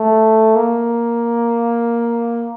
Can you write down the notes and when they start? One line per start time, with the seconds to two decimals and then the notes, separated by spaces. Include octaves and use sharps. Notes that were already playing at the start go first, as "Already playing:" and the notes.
Already playing: A3
0.55 A#3